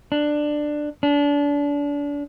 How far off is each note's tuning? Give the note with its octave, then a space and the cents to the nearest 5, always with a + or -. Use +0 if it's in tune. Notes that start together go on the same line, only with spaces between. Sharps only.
D4 +15
D4 -30